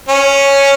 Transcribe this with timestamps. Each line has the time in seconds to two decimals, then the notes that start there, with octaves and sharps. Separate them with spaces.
0.09 C#4